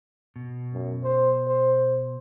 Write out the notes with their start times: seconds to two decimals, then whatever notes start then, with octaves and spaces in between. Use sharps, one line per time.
0.36 B2
0.73 F#2
1.03 C5
1.47 C5